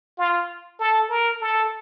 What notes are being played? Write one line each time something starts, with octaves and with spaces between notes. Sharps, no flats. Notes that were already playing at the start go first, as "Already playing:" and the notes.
F4
A4
A#4
A4